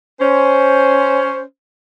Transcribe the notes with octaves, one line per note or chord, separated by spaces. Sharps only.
C#4 C5